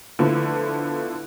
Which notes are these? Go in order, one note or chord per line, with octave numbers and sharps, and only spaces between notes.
D3 F3 A3 B3 E4